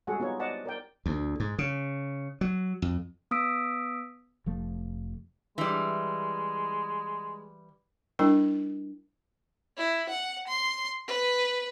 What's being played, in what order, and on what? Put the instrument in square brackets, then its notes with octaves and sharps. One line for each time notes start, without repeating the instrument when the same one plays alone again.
[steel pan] G3 G#3 F#4 G#4 A4 F#5
B3 D#4 F4 C#5
C5 D5 D#5 F#5 A5
A#4 D5 G5
[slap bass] D2
G#2
C#3
F#3
F2
[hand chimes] B3 D#6 E6 B6 D7
[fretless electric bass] F1 F3 A3
[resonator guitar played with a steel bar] E3 G3 [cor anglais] G#3
[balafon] G3 D4 E4 A#4 G5
[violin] E4
F#5
C6
B4